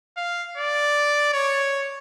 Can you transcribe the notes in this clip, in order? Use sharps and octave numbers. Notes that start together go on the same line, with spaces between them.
F5
D5
C#5